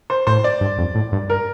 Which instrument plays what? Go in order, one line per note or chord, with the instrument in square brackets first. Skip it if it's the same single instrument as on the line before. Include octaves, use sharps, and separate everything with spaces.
[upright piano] C5
[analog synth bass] A2 [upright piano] C5
[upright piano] D5
[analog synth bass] G2
F2
A2
G2
[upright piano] A#4